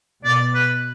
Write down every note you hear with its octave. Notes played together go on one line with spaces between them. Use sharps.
B2 D5
B4